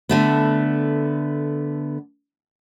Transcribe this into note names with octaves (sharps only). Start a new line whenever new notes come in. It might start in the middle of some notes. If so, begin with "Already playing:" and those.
D3 A3 B3